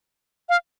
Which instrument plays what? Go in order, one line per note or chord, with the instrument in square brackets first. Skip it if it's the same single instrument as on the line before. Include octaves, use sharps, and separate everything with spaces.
[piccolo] F5